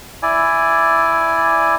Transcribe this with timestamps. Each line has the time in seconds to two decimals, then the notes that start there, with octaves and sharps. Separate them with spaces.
0.23 E4 D5 G#5